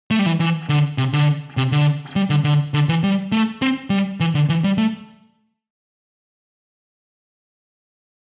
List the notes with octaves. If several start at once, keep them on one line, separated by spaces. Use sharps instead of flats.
A3
G3
E3
E3
D3
C3
D3
C3
D3
G3
D3
D3
D3
E3
G3
A3
C4
G3
E3
D3
E3
G3
A3